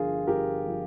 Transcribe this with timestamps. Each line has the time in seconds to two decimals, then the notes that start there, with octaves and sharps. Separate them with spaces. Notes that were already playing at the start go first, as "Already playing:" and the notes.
Already playing: G1 G2 F3 F4 G#4 A#4
0.27 G1 G4 A#4
0.68 F3